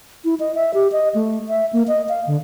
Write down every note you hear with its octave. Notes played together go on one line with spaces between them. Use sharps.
E4
D#5
E5
G4
D#5
A3
E5
A#3
D#5
F5
D3